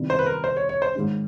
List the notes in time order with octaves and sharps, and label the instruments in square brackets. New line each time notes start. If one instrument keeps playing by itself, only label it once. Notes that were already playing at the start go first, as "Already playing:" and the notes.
Already playing: [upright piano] C3 D#3 G3 B3 E4
[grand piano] C5
B4
A#4
C5
C#5
C#5
C5
[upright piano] G#2 D#3 G#3 C#4